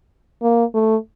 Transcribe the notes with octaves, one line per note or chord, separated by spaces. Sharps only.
A#3
A3